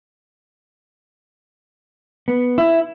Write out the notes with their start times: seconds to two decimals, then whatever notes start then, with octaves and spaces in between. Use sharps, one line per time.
2.28 B3
2.58 E4